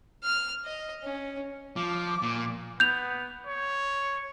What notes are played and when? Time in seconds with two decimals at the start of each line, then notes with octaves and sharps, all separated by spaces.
0.23 F6
0.65 D#5
1.04 C#4
1.76 F3 D6
2.22 A#2
2.80 B3 G6 F7
3.46 C#5